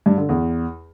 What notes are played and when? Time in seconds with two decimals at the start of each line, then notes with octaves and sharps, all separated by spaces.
0.06 G2
0.17 D3
0.29 E2